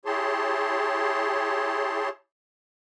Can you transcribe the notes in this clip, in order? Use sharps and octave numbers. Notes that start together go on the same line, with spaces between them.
E4 G4 G#4 C#5 A5 C6